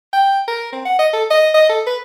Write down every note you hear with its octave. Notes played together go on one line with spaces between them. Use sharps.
G5
A#4
C4
F#5
D#5
A4
D#5
D#5
A4
B4